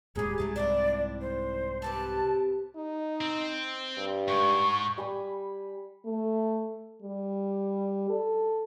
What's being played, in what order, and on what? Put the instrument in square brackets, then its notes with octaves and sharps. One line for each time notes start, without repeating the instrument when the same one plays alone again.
[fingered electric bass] D#1 G#2 [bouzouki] F#3 G3 [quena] G#4
[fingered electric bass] C2 G#2 [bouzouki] F#3 A3 A5
[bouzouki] C4 D4 E4 [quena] D5
[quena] C5
[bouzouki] C4 G4 B4 [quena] A5
[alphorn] D#4
[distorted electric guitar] C4
[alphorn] G2
[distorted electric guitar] G#2 [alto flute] C#6
[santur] G3 G#5 B5
[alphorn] A3
G3
A4